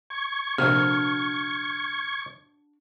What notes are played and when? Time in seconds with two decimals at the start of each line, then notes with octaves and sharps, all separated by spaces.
0.10 C#6 G#6
0.58 A#1 C3 D4 F#4 F5 F6